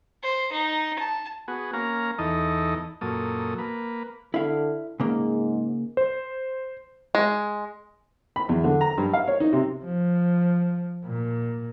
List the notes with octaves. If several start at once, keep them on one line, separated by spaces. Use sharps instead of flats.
C5
D#4
A5
B3 F#4 G#4
A#3 C#4 F5 A#5
E2 D#4 A4 D#5
F#2 A#2 A4 D#6
A#3 B4
D3 E4 F5
G#2 C#3 A#3
C5
G#3
B5
E2
D3
A#5
G2
F5
C#5
D#4
C3
F3
A#2